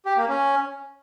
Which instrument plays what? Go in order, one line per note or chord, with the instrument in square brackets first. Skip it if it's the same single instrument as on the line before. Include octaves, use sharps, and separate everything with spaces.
[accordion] G4
A#3
C#4